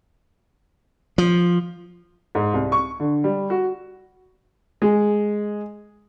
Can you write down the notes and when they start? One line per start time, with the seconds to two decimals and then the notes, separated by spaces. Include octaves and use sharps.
1.18 F3
2.35 G#2
2.53 C2
2.72 C#6
3.00 D3
3.24 G3
3.50 F#4
4.82 G#3